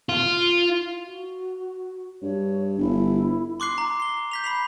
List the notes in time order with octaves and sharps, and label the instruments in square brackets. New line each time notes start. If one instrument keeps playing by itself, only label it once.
[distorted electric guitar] F4
[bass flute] F#4
[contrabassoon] G2 [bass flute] C#5
[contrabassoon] G1 [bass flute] E4
[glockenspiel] C6 D6 F#6 C7
A#5
C7 G7
G6 B6 F7
B5 C7 F7